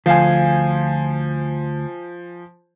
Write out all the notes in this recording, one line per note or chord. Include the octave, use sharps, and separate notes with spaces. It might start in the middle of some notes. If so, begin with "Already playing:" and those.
D2 F3 C5 F5 G#5